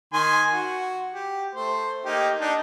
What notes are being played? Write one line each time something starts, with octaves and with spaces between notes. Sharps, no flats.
D#3 G#5 C6
F#4
G4
A3 C5
A#3 D#4 G4
D4 D#4 A5